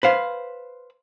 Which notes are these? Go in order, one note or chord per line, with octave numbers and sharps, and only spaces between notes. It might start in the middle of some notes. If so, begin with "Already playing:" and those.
B4 C5 F5